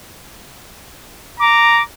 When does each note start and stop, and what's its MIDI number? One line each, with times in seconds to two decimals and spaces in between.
1.40 1.82 82
1.40 1.82 86